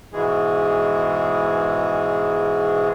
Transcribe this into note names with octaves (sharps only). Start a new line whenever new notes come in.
G#2 B2 E3 G#3 G#4